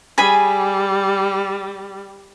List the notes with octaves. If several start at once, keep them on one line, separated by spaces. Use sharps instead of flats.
G3 G#4 G#5 B5